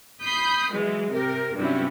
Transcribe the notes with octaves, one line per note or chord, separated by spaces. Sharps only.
B5 D#6 G6 B6 C7
E3 F#3 G#3
C3 G4 A#4
G2 C3 F#3 G3 C#4 E4